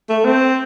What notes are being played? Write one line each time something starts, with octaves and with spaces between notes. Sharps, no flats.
A3
C4